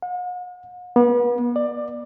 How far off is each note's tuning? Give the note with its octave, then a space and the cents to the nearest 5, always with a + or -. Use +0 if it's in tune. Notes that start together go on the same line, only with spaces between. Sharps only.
F#5 -45
B3 -35
D5 +20